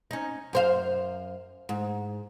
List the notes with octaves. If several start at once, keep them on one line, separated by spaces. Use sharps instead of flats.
C#4 D#4
F#2 C5 F5
G#2